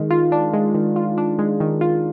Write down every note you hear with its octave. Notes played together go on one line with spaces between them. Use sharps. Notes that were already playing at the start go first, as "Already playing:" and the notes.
Already playing: D#3 G#3
F4
D4
G#3
D#3
F4
D4
G#3
D#3
F4